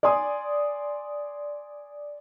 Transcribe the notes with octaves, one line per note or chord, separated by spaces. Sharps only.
D5 G#5 C6 D#6